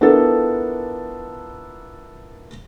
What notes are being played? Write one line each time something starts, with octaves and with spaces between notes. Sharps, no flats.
B3 D4 E4 F4 A4 A#4